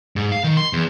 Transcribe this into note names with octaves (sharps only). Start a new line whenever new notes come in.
G#2
F5
D#3
C6
E2